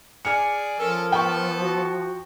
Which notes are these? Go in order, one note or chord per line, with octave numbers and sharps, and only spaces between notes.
G#4 D5 G#5 F6 C#7
F3 C#4 A4 A#4
B3 A4 G5 A5 C#6
F#4